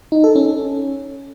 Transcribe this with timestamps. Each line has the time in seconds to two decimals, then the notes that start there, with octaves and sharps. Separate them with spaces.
0.12 D#4
0.24 A4
0.36 C#4